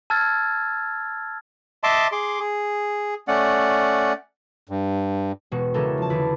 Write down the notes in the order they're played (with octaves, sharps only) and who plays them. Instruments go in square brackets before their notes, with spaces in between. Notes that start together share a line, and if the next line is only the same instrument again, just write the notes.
[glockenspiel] A5 E6 F6 G#6 A6
[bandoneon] D#5 E5 A5 C6 D6
G#4 C6 D6
G#4
A3 C#4 D5 F#5
G2
[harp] E1 B2 F#4
C#3 E3 C#4 D4 A4 A#4
F3 A5
E2 D3 B4 D5